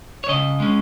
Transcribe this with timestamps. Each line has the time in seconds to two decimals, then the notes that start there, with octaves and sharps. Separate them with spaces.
0.24 C#5
0.29 C#3 D#5
0.60 G#3 C#4